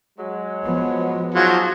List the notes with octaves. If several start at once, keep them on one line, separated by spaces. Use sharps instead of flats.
F#3 G#3
F3 B3
F3 F#3 D#4 F#4 G#4